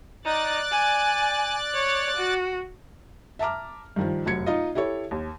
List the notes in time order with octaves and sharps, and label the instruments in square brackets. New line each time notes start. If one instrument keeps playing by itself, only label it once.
[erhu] D#4 [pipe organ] D5 F#6 A6
[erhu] G#5
C#5
F#4
[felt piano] E5 A5 A#5 D6 F6
G2 D#3 F3
F1 F#2 F#4 G#6 C#7
D#4 F4 D#5
E4 G4 A4 C#5
D#2